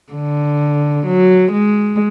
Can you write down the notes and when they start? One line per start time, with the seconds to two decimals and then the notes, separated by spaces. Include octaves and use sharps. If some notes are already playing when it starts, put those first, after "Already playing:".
0.13 D3
1.06 F#3
1.52 G#3